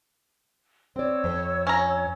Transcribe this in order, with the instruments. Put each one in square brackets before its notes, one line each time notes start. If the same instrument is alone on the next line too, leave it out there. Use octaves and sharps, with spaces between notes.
[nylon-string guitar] C4 D5 [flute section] C#5 E6
[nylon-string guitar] F2
[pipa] C#4 A#5